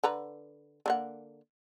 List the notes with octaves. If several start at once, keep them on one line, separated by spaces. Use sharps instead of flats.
D3 B4 A#5
D3 A#3 F#5